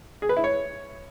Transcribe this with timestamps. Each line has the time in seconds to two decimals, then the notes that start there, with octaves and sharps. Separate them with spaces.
0.22 G#4
0.29 B4
0.37 E4
0.44 C#5